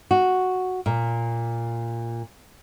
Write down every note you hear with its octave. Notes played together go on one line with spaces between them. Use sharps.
F#4
A#2